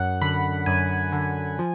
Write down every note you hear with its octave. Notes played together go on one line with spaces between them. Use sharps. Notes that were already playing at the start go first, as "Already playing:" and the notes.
Already playing: F#2 F#5
D3 B5
F#2 G#5
D3
F3